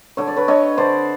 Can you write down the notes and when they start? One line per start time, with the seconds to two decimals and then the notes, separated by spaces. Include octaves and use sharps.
0.17 D3 C#5
0.28 D5
0.36 B4 C#5
0.48 D3 C#5 D#5
0.77 D3 C5 D5